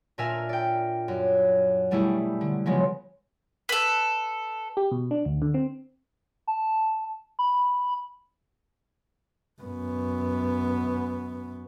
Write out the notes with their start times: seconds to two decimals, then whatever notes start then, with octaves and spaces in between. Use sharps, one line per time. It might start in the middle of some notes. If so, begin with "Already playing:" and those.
0.18 A#2 D4 A#4 E5 G#5 F6
0.49 D5 G5
1.08 F#2
1.91 B2 G3 A3 E4 G4 G#4
2.41 D3
2.66 C#3 F3 F#3 G#3 B3
3.69 A4 B4
4.77 G4
4.91 B2
5.11 D4
5.25 D2
5.42 D3
5.54 C4
6.47 A5
7.39 B5
9.62 F#2 B3